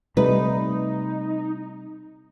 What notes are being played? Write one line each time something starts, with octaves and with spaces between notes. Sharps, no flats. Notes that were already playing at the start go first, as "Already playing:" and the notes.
C3 G3 A3 D#4 B4